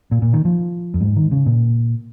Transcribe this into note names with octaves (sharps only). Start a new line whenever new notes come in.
A#2
A#2
D#3
F3
F2
G#2
D#3
C#3
A#2